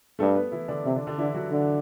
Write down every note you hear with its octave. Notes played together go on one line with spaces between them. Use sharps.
G2 A3 A4
B3 B4
E3 E4
D3 D4
C3 E3 E4
D3 D4
D3 D4
D3 E3 E4
F#3 F#4
D3